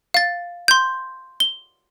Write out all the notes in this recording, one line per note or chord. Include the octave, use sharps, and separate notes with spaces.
F5 A6
C6 G6
G7